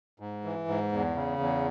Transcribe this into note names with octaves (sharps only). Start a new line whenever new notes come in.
G#2
E3
G#2
E2
C#3
E2